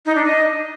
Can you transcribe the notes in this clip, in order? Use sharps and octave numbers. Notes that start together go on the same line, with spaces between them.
D#4
D4
D#5